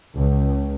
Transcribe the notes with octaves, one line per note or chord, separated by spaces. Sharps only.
C#2